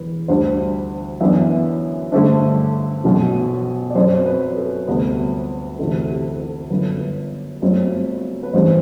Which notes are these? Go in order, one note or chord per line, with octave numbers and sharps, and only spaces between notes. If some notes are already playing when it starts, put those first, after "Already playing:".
Already playing: E1 E2 B4
D2 D3 G3 D4 C5
F#2 E3 B3 D4 E5
G2 D3 A3 D4 C5
B1 B2 F#3
D5
F#2 F#3 C4 C5
B4
A4
D2 C3 G3 B3
D2 C3 E3 A4
A4
G4
A4
G1 F#2 D3 B4
G1 F#2 F#3 A3 C4
B4
A1 G2 E3 G3 C4 C5